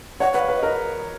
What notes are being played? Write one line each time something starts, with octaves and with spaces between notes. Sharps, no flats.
C#5 F#5
B4 F#5
F5
B4
A#4 D#5